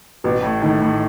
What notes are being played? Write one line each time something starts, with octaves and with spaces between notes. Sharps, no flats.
A1 B2
A2
A2 D#3
A2